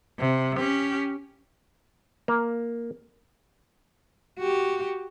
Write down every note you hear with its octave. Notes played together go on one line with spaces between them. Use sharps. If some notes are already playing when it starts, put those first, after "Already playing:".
C3
C#4 G4
A#3
F#4 G4